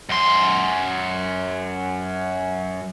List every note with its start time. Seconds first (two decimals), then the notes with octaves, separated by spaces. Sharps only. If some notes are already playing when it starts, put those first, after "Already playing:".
0.09 F#2 C6